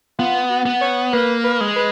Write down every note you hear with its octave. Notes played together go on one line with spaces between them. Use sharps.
B3 F4
F#4
B3
C#5
A#3 B4
B4
G#3
B4